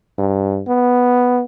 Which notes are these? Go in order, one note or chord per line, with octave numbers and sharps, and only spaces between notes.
G2
B3